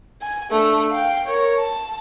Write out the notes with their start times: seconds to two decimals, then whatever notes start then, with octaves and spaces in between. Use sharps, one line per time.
0.21 G#5
0.51 A3 D4
0.91 F5 G5
1.26 A#4 C#5
1.59 A5